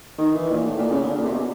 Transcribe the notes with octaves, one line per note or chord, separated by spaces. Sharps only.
D#3
E3
A#2
A2
A#2
C#3
D3
A#2
C3
B2